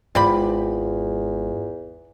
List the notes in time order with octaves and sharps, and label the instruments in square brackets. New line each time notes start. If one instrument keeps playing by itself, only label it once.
[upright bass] G#1 G#2 [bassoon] E2 [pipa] C4 D5 B5 [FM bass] F4